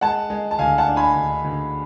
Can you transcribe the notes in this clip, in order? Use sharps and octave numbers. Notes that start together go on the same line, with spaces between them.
G#3 F#5 A5
G#3
A5
D2 F5 G#5
F#5 A5
D4
G#5 B5
D2
D2